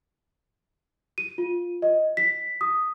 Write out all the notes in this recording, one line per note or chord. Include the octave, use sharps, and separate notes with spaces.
D#7
F4
D#5
B6
D#6